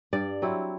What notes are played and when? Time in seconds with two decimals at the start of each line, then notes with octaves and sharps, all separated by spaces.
0.13 G2 D5
0.42 F#3 C4 E4